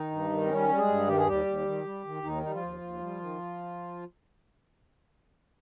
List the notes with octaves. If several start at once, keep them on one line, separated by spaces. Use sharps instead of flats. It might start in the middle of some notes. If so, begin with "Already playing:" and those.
Already playing: D#3 D#4
G2
D#3
C4
G3 C#4
G3
G#3 G#4
G2
D#3 G4
G#4
D#2 G3 G4
D#2
D#3
G3
D#3
D#2 D#3 D#4
G3 D#4
F3 F4
D#2
D#2
G3
D#3